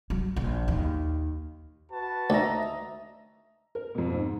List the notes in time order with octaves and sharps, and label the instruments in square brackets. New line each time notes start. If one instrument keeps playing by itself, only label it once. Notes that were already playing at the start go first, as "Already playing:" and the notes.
[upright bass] F#3
A#1
D#2
[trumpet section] F#4 B4 A5
[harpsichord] D2 [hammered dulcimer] D#5 E5 A#5
[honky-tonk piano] A#4
F2 B2
G#2